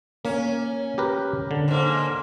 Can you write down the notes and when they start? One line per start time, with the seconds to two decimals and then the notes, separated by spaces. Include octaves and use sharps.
0.25 A#3 C#4
0.98 G4 A#4 B4
1.51 D3
1.68 G#2 A#3